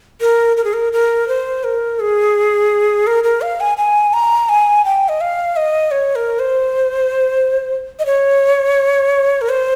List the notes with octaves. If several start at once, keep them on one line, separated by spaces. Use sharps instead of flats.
A#4
A#4
G#4
A#4
A#4
C5
A#4
G#4
A#4
A#4
F5
G#5
G#5
A#5
G#5
G5
D#5
F5
D#5
C#5
A#4
C5
D#5
C#5
A#4
C5